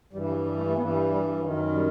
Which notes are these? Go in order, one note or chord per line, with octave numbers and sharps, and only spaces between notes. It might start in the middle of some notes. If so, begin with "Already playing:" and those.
G2 E3 G3
F#3
G3
A3
A3
G2 E3 B3
G3
G3
F#2 D#3 F#3
F#3
G3